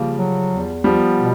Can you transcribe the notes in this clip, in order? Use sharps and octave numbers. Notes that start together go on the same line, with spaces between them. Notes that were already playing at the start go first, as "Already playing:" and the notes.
Already playing: C#3 F3 G3 A#3
F#3
E2
F3 G3 B3
B2